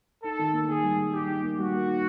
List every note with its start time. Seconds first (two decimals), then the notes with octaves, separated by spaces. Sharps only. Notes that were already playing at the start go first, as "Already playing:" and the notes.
0.24 D#4 A4
0.39 D#3
0.53 A#3
0.68 D#3 G#4
0.83 G3
0.98 G3
1.13 D#4 G4
1.28 D#4
1.43 A#3
1.58 G3 F#4
1.73 A#3
1.87 D#4